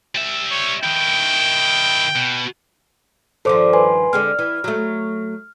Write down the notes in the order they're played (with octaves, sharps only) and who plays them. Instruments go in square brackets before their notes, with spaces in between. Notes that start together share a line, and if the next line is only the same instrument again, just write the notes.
[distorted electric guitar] G3 E5
[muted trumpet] C#5
[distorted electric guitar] D#3 E4 [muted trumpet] G5
[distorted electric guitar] B2
[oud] G2 D#3 F3 [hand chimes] A4 C5 D6
[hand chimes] B4 G#5 C6
[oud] D3 G#3 C4 [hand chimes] F6
[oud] E3
F#3 A3